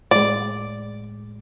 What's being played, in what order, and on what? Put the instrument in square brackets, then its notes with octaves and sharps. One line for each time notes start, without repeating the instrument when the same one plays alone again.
[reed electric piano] A2 G#3 [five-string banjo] D5